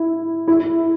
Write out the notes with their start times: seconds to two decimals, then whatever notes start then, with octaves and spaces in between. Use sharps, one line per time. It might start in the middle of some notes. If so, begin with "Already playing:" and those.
Already playing: E4
0.48 E4